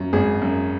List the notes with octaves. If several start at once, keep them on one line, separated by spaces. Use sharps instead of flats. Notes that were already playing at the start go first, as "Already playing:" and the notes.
Already playing: F#2
G#1 G#4
F#2